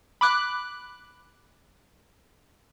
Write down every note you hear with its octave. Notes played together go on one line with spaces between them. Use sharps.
B5 D6 F#6